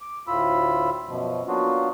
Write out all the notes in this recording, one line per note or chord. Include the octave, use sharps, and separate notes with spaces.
D6
D2 A2 F4 B5 E6
F#2 B2 F3
F#3 A#3 B3 D4 F4 F#4